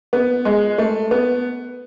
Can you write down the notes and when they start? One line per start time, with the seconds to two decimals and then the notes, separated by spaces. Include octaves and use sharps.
0.13 B3
0.45 G#3
0.78 A3
1.11 B3